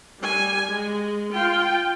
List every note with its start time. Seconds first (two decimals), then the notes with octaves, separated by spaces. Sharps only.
0.20 G3 G#5
0.66 G#3
1.33 F4 G5